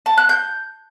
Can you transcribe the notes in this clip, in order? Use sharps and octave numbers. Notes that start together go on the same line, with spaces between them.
A5
F#6
G6